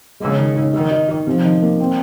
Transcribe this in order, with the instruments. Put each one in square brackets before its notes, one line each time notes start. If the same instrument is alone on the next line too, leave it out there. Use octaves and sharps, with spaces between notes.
[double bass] C#3 [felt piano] G#3
[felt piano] D#3
D#4
[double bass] D#3 [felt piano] D#4
[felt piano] D#4
D#4
[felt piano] C3 [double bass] F3
[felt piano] D#3
A#3
C4